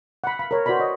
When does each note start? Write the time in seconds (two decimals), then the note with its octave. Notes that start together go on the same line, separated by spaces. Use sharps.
0.24 F#5 B5
0.39 F5 B5
0.51 A#4 C#5
0.66 F#4 B4 C5 D5 B5
0.79 C#5 D#5